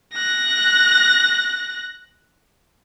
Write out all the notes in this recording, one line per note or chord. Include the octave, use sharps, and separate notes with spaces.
F#6 A#6